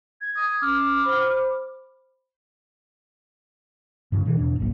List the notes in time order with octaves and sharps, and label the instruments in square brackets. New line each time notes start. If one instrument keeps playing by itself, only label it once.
[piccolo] G#6
[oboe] D#6
[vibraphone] C#4 [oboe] D6 [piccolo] F6
[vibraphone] C5 B5
[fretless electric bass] G2 C#3
B2 D#3 E3
E2 B2 D4
F1 B1 F#2 A#2